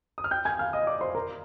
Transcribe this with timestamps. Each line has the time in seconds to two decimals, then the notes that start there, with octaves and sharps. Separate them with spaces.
0.18 D#6
0.24 F6
0.31 G5 G6
0.45 G#5 G#6
0.59 F5 F6
0.73 D#5 D#6
0.87 D5 D6
1.01 C5 C6
1.15 A#4 A#5